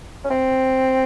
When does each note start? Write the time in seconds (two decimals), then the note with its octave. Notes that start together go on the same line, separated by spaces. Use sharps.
0.24 C#4
0.30 C4